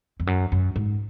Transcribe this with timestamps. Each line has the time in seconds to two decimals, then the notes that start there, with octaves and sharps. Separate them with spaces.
0.20 F2
0.27 F#2
0.52 F#2
0.76 G#2